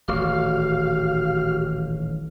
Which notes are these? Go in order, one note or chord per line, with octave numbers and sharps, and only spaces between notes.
D#1 A1 F#4 G4 F5 F6